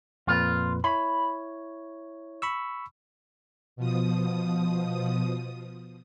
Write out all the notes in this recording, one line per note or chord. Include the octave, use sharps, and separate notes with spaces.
F2 A#2 F4 B4
E4 C#5 B5
B5 C#6 E6
B2 F3 D#6